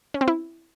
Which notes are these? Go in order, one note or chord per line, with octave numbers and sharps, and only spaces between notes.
C#4
C4
E4